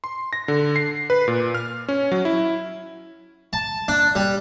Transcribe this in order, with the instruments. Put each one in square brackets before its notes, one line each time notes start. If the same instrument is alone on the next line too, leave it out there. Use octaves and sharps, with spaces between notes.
[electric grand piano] C6
A#6
D3
C7
B4
A#2
F6
C#4
F#3
E4
[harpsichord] A5
D4
G3